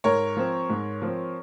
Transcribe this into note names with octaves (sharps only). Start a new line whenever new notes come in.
G#2 A#4 C#5
F3 C4
G#2
F3
C4